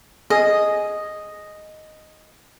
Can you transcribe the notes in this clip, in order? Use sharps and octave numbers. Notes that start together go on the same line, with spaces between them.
G#4 D#5